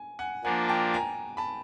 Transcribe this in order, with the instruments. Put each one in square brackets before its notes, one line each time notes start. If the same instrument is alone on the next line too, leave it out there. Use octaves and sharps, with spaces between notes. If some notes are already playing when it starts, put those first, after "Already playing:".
Already playing: [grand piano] G#5
F#5 G#5
[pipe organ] F3 A#3 D4 [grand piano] F#5 G#5
[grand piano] G5 A5
G#5 A#5
A5 B5